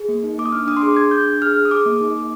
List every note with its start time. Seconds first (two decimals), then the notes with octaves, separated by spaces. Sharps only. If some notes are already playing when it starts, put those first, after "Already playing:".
Already playing: G#4
0.09 A#3
0.24 D#4
0.38 A#3 D6
0.46 D#6
0.52 D4 F6
0.67 D4 D#6
0.77 C6
0.82 G#4 D6
0.96 G#4 G#6
1.11 D4 G6
1.26 D4
1.42 G#4 F6
1.56 G#4
1.65 D#6
1.71 G#4 D6
1.86 A#3
2.01 D#4
2.15 A#3